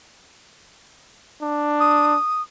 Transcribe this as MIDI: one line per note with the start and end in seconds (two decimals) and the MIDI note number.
1.42 2.17 62
1.80 2.42 87